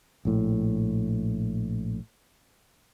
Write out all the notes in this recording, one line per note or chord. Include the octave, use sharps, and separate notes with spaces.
A#1 A2